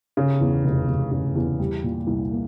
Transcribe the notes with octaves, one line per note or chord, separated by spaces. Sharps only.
C#3
E2
F1
F1
C#3
E2
G3
A#2
C2
A#3